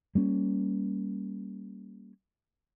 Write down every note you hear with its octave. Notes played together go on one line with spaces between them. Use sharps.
G3 A#3 C#4